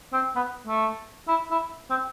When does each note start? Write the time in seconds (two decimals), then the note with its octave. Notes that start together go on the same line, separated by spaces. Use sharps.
0.13 C4
0.36 B3
0.67 A3
1.28 E4
1.51 E4
1.90 C4